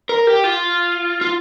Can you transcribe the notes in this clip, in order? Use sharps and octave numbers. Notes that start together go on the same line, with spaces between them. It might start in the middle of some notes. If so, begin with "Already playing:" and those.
A#4
G4
F4
F4